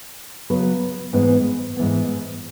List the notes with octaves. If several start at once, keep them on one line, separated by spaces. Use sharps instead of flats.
C#3 F#3 B3 F#4 B4
G#2 E3 B3
G#2 E3 B3